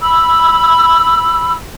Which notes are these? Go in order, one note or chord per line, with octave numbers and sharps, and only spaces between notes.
B5 E6